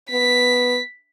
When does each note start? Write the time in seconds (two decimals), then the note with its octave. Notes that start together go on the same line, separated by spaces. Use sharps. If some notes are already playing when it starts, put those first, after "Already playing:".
0.11 B3 B6